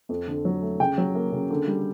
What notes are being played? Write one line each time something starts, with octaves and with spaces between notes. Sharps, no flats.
F2
D3
F#3
A3
C#3 G5
F#3
A#3
C#3
D3
G3